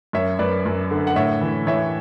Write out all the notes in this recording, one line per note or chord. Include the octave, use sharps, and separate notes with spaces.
F#2 C#5 E5
F#2 B4 D5
F#2
D3
F#5
A2 C#5 E5
E3
E3 C#5 E5